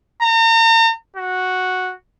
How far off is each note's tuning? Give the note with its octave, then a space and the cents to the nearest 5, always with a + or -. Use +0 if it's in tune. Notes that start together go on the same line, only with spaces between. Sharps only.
A#5 -40
F#4 -5